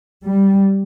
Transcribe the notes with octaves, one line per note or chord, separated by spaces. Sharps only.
G3